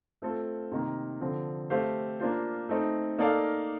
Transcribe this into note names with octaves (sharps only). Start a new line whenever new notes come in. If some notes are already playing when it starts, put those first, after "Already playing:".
A3 C4 F4 A4
C3 D#3 A#3
D3 F3 C4
A3 C4 G4 C5 F5
A#3 D4 F4 C5
A3 C4 D#4
A#3 D#4 A4 D5 F5